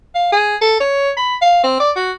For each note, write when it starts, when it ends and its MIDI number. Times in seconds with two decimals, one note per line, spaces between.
0.15 0.31 77
0.33 0.56 68
0.62 0.78 69
0.80 1.11 73
1.17 1.35 83
1.42 1.63 77
1.64 1.76 60
1.80 1.91 74
1.96 2.12 66